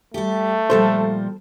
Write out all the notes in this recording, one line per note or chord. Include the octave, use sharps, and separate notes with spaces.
G3 A3 G4
A#2 F3 G3 A4 C5